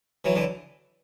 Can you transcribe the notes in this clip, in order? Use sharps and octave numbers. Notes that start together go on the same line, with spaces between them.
E3 F#3
D3 E3